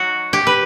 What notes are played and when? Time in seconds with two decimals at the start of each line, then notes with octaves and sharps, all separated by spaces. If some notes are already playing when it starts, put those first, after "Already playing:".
Already playing: F#3 D#4 F#4
0.33 G4
0.47 B4